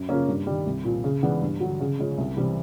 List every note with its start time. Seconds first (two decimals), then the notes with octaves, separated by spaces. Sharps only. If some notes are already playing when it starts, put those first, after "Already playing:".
Already playing: F#2
0.09 C#3 F3 A#3 C#4
0.28 G2
0.47 D#3 G3
0.67 C2
0.85 A#2 F3
1.04 C#3
1.23 E3 G#3 B3 D4
1.42 G2
1.60 D3 F#3
1.80 C#3
1.99 F3 G#3 C#4
2.18 C2
2.37 C3 E3 G3 C4